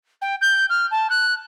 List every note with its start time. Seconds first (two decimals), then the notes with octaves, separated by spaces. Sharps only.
0.21 G5
0.41 G6
0.69 F6
0.91 A5
1.10 F#6